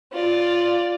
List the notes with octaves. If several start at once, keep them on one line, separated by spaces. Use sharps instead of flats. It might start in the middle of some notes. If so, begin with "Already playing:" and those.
F4 D5